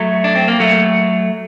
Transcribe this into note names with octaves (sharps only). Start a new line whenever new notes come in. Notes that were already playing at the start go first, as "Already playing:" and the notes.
Already playing: F#3 A3
D4
C4
A#3
F#3 A3